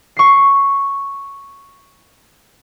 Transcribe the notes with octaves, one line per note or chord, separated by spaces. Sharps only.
C#6 C7